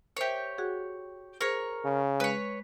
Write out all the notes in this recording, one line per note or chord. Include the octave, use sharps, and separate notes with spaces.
G4 A#4 C5 C#5 E5
F#4 G#4 F#5
G#4 A#4 C5 C#5 G#6
C#3
G#3 B4 C#5